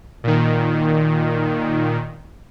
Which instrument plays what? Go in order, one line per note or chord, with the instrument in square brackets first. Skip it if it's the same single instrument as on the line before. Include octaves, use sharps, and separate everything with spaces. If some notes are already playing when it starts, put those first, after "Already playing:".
[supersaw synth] A#2 D#3